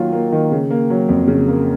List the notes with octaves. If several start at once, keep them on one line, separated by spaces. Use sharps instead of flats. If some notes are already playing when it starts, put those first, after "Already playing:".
Already playing: D#3 F#3 A#3 F4
A#3
D#3
C#3
A#3
F#3
F2
C#3
A#3